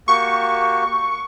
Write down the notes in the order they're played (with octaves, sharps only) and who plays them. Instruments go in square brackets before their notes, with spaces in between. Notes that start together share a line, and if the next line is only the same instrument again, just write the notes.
[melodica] A#3 F#4 G4 [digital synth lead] C#6